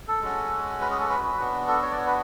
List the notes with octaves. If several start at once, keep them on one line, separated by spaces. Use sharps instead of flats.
A4
G#3 C#4 F#4
B4
G#4
A4
B4
B4
B3 D4 F#4
A4
C#5
D5
C#5
B4